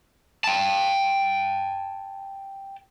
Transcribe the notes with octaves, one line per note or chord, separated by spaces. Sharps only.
G5 A5